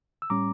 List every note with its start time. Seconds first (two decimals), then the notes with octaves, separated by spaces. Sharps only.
0.22 E6
0.30 A2 G3 C#4 A#5 D6